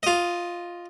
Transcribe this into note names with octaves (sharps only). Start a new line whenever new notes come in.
F4 D#5